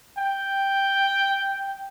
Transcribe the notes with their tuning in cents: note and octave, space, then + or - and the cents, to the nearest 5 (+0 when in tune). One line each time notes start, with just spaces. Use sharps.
G5 +0